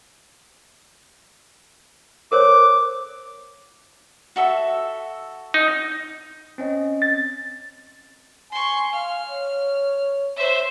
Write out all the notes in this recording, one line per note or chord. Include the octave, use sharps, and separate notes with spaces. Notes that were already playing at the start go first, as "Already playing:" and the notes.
A#4 C5 C#5 D6
F#4 A4 E5
D#4
C4 C#4 D#5
A6
G#5 C6 C#6
F5 F6
C#5
C5 C#5 E5